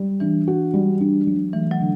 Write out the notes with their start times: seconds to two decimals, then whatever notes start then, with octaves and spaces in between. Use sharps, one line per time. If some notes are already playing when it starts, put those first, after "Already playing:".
Already playing: G3
0.20 E3 D4
0.48 F#4
0.74 G3
1.00 D4
1.27 F#3
1.53 E3 A3
1.71 F#3
1.80 D3